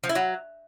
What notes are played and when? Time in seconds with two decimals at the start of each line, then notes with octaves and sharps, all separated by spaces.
0.04 F3
0.09 E4
0.15 F#3